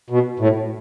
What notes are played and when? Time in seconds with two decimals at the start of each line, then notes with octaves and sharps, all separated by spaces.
0.10 B2
0.39 A2